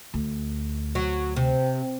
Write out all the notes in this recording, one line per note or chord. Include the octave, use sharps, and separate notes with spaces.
D2
F#3
C3